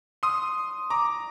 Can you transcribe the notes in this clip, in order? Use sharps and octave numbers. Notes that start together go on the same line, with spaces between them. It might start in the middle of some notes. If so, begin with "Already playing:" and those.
C6 D#6
A#5 D6